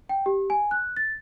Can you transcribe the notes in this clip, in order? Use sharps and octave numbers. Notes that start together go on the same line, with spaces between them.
G5
G4
G#5
F#6
A6